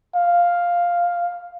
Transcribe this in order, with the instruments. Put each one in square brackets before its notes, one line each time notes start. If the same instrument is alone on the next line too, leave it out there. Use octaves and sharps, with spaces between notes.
[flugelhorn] F5